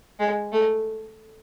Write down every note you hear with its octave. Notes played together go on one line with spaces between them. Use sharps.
G#3
A3